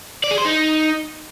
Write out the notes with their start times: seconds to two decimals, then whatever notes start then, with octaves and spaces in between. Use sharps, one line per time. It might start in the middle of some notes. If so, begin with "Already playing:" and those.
0.24 D5
0.31 G#4
0.38 C5
0.45 D#4